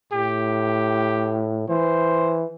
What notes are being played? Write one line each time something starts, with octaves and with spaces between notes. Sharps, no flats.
A2 G4
E3 C5